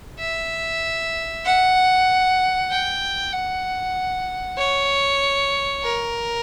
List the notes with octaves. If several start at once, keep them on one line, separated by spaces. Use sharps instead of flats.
E5
F#5
G5
F#5
C#5
A#4